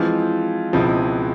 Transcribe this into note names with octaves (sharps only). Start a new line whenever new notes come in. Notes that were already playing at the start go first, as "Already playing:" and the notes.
Already playing: E3 F3 G#3 C4 F4
C#2 B2 F3 G#3 C4 E4